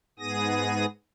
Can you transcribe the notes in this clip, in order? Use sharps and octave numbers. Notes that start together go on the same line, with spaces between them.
G#2 B3 G#4 D#6 A#6